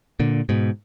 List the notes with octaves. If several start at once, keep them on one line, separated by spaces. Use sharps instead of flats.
A#2 D3
G#2 B2